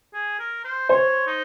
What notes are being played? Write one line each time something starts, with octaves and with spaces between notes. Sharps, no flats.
G#4
A#4
C5
C5 C#5
D#4